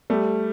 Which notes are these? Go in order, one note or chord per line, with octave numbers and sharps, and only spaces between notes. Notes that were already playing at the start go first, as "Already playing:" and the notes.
G3 A3